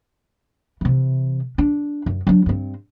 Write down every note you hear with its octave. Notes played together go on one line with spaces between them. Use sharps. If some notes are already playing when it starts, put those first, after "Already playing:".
C3 E3
D4
F#2
F#3 D4
G2 C4